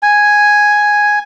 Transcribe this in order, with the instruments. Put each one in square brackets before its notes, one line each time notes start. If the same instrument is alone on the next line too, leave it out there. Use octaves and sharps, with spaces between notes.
[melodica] G#5